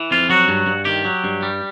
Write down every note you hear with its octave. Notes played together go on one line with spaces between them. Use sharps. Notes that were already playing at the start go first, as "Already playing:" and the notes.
Already playing: E3
F2 F4
F#3 F#4
G2
G2
D#3 G4
F#3
G2
G3